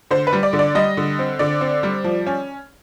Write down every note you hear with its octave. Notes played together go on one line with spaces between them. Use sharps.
D3 C5
B4
G3
D5
D3
D5
G3 D#5
D3
C4
D3 D5
C4
G3
F3
C#4